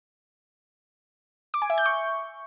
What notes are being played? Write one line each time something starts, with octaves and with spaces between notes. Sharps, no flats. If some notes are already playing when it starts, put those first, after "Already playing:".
D6
G#5
E5
G6
C#6